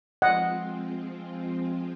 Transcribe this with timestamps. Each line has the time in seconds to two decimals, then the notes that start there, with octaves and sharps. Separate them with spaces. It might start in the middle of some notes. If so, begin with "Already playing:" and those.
0.22 F3 G#3 C4 F4 D#5 F#5